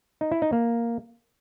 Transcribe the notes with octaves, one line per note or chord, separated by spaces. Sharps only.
D#4
E4
D#4
A#3